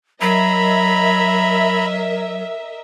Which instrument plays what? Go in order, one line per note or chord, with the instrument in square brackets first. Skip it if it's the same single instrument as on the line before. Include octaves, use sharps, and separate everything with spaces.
[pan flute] F#3 [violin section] A#4 D#5 E5 [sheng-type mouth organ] A#5 B5